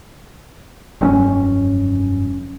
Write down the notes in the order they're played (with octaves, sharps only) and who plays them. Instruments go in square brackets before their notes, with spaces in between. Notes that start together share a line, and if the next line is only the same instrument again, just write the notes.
[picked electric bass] F1 C4 C#4 [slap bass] G2 F3 F#3